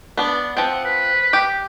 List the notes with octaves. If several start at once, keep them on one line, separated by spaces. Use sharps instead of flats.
B3 D4
F3 C4 F#5
B4
G4